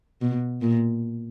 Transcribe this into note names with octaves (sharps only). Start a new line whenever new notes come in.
B2
A#2